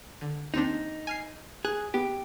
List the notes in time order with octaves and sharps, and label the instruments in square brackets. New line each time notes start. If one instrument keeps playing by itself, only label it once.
[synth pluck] D3
[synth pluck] D#2 C4 D4 [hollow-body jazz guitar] D#4
[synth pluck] G#5 F6 C7
[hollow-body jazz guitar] G#4 [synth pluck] F#6
[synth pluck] B3 [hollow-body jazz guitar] G4